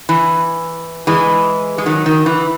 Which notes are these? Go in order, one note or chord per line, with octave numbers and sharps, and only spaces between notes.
E3
E3 G#3
G#3
D#3 F#3
D#3
E3